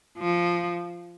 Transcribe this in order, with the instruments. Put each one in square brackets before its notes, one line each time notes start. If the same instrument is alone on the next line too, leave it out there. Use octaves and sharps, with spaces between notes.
[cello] F3